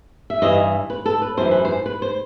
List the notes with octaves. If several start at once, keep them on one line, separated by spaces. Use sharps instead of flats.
E5
G2 E3 D#5
B4
A4
B4
F#2 E3 C5
B4
C5
B4
C5